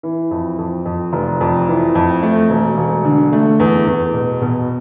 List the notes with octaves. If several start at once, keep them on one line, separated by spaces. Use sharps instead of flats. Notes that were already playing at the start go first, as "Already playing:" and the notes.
E3
F2
F2
F2
F1
F2
E3
F2
A3
E1
E1
D3
A3
E2
E2
B2
B2